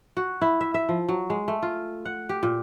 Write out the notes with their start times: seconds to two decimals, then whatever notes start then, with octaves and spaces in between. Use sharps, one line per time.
0.17 F#4
0.42 E4
0.61 E5
0.74 E5
0.89 F3
1.09 F#3
1.30 G#3
1.48 A3
1.63 F4
2.05 F#5
2.29 G4
2.43 A#2